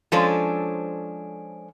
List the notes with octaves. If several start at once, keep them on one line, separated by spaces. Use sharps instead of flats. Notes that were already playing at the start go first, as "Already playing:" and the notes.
F3 G#3 C#4 D4 A4 C5